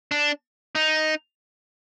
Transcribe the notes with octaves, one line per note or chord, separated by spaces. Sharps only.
D4
D#4